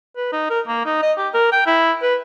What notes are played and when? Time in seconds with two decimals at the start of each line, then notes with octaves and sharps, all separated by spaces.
0.16 B4
0.33 D#4
0.50 A#4
0.68 A#3
0.85 D#4
1.02 D#5
1.18 G4
1.34 A#4
1.52 G5
1.66 E4
2.02 B4